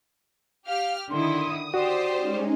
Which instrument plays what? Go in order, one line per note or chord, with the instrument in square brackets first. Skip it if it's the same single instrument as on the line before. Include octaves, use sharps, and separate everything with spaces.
[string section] G4 F6 [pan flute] F5
[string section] D3 D#3 E4 [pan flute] C6 [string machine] D#6
[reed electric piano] F#4 [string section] G4 C5 [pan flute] D5
[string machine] G#3 C#4 D#4